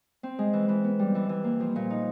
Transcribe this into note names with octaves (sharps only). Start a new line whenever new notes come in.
C4
G#3
E3
E3
B3
G3
E3
E3
A#3
F3
A#2
D#4